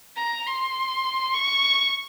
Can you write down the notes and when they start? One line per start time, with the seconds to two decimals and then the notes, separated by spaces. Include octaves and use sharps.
0.16 A#5
0.47 C6
1.34 C#6